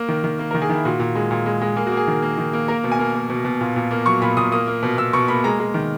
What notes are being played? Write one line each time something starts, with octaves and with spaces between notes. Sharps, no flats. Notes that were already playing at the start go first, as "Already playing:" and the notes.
Already playing: A#3
D#3
D#3
A#3
A#4
D#3
G#4
D#3 E4
A#2 F#4
A#2
G#3
A#2
G#3
G#3
A#3 G#4
F#4
A#3
G#4
D#3
A#3
D#3
A#3
A#3 A#4
B2
G#5
A#3
A#3
B2
B2
A#2
A#2
A#3
F#3 C#6
A#2 B5
A#2 D#6
A#3 D#6
A#3
B2
B2 E6
B2 C#6
A#3 B5
G#3 A#5
G#3
D#3